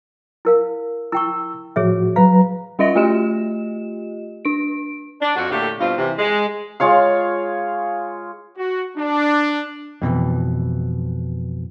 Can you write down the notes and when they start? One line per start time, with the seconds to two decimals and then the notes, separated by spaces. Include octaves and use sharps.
0.45 E4 A#4 F5
1.12 E4 G5 C#6 E6
1.76 A2 F3 F#4 G#4 C#5 E5
2.16 F#3 B4 F5 A#5
2.79 G3 C#4 F4 D#5 E5 A#6
2.96 A3 F4 G4 D#5 E7
4.45 D4 D7
5.22 D4
5.36 F2 F#4
5.50 A2 D3 A3 A#3 G4
5.79 G2 B2 C4 F4
5.98 C3 E3
6.18 G#3
6.80 G#3 F4 C#5 F5
8.57 F#4
8.97 D4
10.02 F2 B2 D3 E3